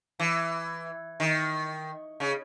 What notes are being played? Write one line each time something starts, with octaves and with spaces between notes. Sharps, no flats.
E3
D#3
C#3